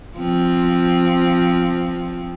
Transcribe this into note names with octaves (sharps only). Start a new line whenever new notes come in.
F3 C4